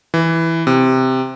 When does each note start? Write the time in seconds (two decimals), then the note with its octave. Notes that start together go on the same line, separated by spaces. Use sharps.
0.14 E3
0.67 C3